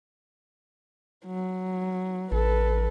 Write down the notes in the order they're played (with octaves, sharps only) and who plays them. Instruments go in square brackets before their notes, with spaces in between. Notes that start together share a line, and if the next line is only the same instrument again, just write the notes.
[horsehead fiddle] F#3
[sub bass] A1 [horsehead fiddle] A4 B4